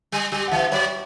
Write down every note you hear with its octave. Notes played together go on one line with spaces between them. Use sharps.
G3
G3 G4
F#5
E3 E5
F#3 C#5